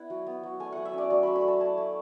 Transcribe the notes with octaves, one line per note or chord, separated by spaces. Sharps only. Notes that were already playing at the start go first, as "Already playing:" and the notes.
Already playing: B3 E4 F#5
F#3
B3
F#3
A3 G#5
F#3 F#5
E5
C#4 D5
F#3 D5
A3 B5
B5
F#3 A5
E4 A5
A3